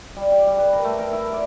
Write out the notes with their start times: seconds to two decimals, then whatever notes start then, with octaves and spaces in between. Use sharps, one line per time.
0.16 G3
0.32 G4
0.46 G3
0.58 B4
0.73 A#4
0.84 A3
0.99 A#4
1.13 E4
1.33 D5